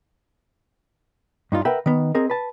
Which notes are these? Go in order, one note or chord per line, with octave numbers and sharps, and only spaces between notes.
G2 D#4 F4
A#4 B4 E5 F#5 G5 B5
D#3 B3
C4 G#4 A#4 D#5
B4 A5